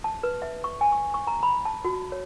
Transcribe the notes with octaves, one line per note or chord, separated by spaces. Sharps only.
A5
B4
E5
C#6
G#5
C#6
C#6
A#5
B5
A5
F#4
C#5